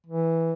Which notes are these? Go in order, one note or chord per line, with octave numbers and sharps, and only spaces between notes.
E3